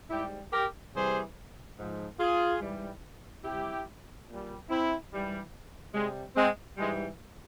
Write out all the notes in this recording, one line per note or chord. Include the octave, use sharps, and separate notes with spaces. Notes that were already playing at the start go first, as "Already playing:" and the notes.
G#2 G3 E4 G4
G4 A#4
C3 E3 G3 G#4 C5
G#2 F3
F4 G#4
G#2 E3 G3
C3 G3 E4 G4
A#2 G3
C4 E4
G#2 E3 G3
C3 G3 G#3
G#3 C4
G#2 E3 G3 G#3